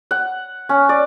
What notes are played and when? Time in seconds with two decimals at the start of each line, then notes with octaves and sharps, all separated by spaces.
0.11 F#5
0.69 C#4
0.89 D5